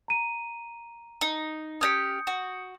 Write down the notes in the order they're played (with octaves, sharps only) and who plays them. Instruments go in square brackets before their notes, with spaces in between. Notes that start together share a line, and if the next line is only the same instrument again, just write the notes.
[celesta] A#5 D#7
[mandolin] D#4
[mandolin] C#4 D#4 G4 [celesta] D#6 G6 C#7
[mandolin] F#4